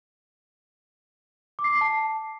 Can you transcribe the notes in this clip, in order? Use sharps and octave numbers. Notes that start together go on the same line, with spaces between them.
D6
C7
D6
C7
A5